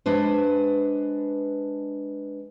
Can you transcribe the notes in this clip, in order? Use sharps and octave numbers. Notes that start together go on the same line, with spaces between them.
G#3 D4 B4 C5